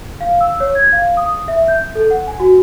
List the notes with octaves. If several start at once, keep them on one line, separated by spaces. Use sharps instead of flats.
F5
E6
C#5
G#6
F5
D#6
E5
G6
A4
F#5
G#5
F#4